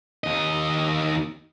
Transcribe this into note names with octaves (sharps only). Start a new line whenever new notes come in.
D#2 D#5